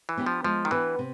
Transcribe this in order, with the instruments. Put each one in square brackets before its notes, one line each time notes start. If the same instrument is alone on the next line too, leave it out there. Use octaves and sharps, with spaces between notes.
[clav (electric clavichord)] E3
[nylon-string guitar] B3 D4 G4 B4
[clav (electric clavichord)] F3
[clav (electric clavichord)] F3 [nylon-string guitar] G#3
[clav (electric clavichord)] D#3
[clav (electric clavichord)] E3 [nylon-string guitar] B3 D4 G4 B4
[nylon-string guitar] C3